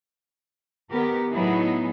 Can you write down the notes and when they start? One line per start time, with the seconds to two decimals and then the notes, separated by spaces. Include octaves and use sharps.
0.92 D#3 B3 G4 A#4
1.31 A2 F#3 B3 D#4 E4 G#4